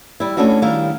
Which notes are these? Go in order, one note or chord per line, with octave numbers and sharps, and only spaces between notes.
G3 E4
A3 C#4 D4 E4 F#4
D#3 G3 E4 F5